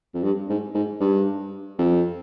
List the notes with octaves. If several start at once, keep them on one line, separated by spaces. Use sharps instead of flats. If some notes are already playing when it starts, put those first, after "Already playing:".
F2
G2
G#2
G#2
G2
F2